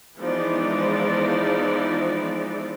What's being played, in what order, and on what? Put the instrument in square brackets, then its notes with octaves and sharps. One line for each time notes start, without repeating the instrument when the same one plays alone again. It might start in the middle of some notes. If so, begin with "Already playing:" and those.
[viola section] E3 F3 G#3 B3 D#4 D5